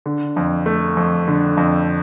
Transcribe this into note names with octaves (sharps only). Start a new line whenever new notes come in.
D3
F2
A3
F2
D3
F2